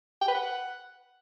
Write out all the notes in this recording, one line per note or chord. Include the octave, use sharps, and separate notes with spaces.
G5
B4
F#5